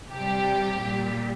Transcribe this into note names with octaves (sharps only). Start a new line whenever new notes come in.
C3 G4
G3
A#2 G3